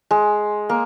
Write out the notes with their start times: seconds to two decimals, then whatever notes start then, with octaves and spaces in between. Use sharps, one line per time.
0.11 G#3
0.69 A#3